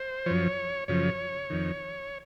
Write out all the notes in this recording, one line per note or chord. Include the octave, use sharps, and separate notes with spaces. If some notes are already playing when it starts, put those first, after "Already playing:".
Already playing: C5
F#2 F3 C#5
F#2 C#3 F3 C#5
F2 D#3